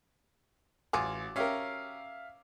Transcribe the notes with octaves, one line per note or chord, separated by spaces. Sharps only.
A1 F#3 F4 G#4 D6
C#4 G4 A#4 E5 F5